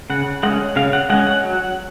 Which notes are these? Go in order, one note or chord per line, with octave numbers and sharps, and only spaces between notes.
C#3 F#5
G#3 C#4 F#5
C#3 F5
F#5
G#3 C#4 F#5
F#5
F#3